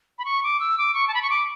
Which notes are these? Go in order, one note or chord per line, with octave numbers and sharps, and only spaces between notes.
B5
C#6
D6
E6
D6
C#6
A5
B5
C#6
D6